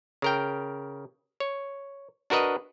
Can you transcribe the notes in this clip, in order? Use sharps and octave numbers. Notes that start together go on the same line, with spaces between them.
C#3 A#4 G5
C#5
D4 F#4 A#4 B4 D#5